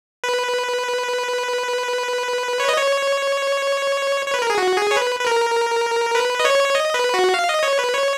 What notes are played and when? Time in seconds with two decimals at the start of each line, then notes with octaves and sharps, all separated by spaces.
0.24 B4
2.60 C#5
2.69 D#5
2.77 C#5
4.26 C#5
4.34 B4
4.42 A#4
4.50 G#4
4.58 F#4
4.77 G#4
4.91 C#5
4.97 B4
5.20 B4
5.26 A#4
6.15 B4
6.39 D#5
6.45 C#5
6.75 D#5
6.94 B4
7.14 F#4
7.34 F5
7.49 D#5
7.63 C#5
7.79 B4
7.93 C#5